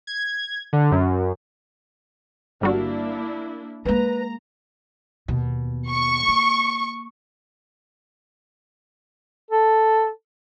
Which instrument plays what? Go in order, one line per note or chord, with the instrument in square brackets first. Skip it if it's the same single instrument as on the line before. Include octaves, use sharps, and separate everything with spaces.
[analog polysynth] G#6
D3
F#2
[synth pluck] G1 G3 F#4 [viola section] A#3 D4 E4
[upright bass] G#3 A#3 [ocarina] B4 [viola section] A#5
[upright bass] D#2 B2
[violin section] C#6
[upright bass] A#3
[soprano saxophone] A4